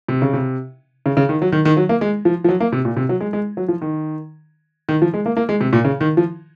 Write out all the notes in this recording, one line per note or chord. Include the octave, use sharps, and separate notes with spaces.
C3
C#3
C3
C#3
C#3
D#3
F#3
D#3
D#3
F#3
A#3
G#3
F3
F3
F#3
A#3
C3
A#2
C3
F#3
G#3
G#3
F#3
F3
D#3
D#3
F3
G#3
A#3
A#3
G#3
C3
A#2
C#3
D#3
F3